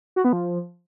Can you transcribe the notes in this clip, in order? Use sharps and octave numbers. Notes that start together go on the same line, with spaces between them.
F#4
B3
F3